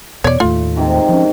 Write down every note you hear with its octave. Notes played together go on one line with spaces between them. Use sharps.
E2 B2 C#5 D5
D#2 A2 A3 F4
G#2 C3 D#3
F3 C#4